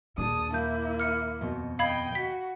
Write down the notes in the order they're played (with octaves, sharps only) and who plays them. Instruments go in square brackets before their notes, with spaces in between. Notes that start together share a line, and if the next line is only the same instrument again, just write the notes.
[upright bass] D#2 A#2 [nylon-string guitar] D4 G#4 [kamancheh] A5 D#6
[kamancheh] A#3 E4 [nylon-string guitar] F5 [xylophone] G6
[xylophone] F6 C#7
[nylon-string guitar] F2 B2
[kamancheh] D#5 G5 [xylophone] F5 B5 G#6
[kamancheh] F#4 [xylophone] B6